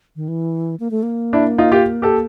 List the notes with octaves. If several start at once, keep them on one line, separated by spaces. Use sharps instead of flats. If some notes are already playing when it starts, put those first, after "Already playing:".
D#3
E3
A#3
A3
A#3
D4 E4
D#4 F4
F4 G4
G4 A4